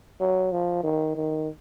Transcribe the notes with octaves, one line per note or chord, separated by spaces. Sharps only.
F#3
F3
D#3
D#3